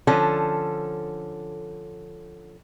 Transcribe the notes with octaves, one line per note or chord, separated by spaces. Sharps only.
D3 F3 C#4 A4